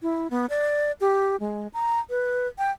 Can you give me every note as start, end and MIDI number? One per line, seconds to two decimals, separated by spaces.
0.02 0.27 64
0.30 0.46 59
0.50 0.92 74
1.01 1.36 67
1.40 1.68 56
1.74 2.00 82
2.10 2.48 71
2.58 2.71 79